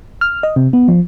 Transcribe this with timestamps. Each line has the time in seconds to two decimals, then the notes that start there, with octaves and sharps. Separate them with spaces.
0.21 F6
0.43 D#5
0.56 C3
0.73 B3
0.88 F3